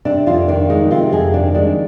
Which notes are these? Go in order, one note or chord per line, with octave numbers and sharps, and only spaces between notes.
C3 D4
F2 F4
D#3 D4
G#3 D#4
C3 F4
F2 G#4
D#3 D4
G#3 D4